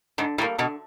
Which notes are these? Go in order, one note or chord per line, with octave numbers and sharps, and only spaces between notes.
G#2 D3
A2 G3 A#3
B2 D3